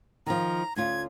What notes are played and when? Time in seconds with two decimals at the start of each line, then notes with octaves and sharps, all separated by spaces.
0.26 D#3 F3 A#5
0.76 D2 C#4 F4 G#6